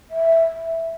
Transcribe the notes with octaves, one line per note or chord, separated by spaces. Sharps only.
E5